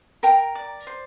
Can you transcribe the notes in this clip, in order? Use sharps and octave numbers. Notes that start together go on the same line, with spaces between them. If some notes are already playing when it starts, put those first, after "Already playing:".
A#4 G5 A#5
D5
C5